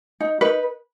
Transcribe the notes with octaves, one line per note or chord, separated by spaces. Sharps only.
D#4
D#4 B4